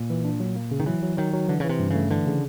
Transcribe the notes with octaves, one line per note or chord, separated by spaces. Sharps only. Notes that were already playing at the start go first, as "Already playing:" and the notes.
Already playing: A#2
E3
D4
F#3
A#3
C#3
D#3
E3 F#3
F#3
D#3 F#3
F#3
D3 E3
C#3
E3
C3
G2
C#3 A3
D3 E3
C#3